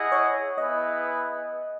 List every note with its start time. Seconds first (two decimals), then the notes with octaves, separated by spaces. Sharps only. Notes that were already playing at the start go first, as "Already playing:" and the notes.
Already playing: E4 G#4 D#5 F#5
0.12 C#5
0.58 B3 E4 G#4 B4 D#5